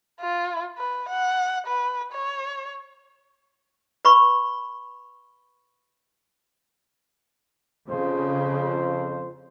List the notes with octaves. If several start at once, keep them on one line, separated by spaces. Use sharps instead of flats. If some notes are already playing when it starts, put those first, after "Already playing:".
F4
B4
F#5
B4
C#5
B4 B5 C#6
F2 C#3 F3 C5